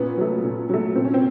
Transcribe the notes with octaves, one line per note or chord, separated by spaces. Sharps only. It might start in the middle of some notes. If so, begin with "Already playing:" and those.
Already playing: A#2 B3 C#4
F#3 A3
A#2
F#3 A3
A#2 C4
C#4
C4